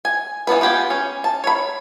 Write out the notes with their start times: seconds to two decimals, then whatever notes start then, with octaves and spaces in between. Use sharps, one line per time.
0.05 G#5
0.47 E3 F#3 B3 B4
0.61 B3 F4 G4 G#4
0.90 C#4
1.24 A5
1.44 C#5 B5